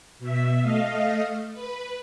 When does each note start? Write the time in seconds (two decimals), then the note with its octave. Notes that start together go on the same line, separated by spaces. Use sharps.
0.19 B2 E5
0.61 A3 D#5 F5
1.53 B4